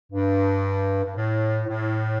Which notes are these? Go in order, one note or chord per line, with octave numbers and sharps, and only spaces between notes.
G2
G2
A2
A2